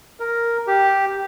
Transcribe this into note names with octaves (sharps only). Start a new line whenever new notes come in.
A#4
G4